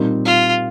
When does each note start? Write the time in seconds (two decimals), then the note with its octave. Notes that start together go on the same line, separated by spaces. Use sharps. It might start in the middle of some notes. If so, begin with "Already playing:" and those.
Already playing: A#2 G3 C4 D#4
0.26 F4